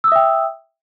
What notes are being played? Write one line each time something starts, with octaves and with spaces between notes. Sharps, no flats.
E5 G5 D#6 E6